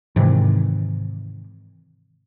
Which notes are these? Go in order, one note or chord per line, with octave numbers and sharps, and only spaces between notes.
G#2 C3 D#3 E3